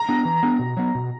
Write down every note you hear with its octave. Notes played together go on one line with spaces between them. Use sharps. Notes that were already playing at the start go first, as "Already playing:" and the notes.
Already playing: A#5
B3 D4
E3
B3 D4
B2
F#3 B3
B2